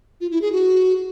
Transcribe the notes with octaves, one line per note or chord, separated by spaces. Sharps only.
F4
E4
G#4
F#4